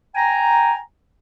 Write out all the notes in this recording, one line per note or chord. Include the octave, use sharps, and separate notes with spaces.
G5 G#5 A#5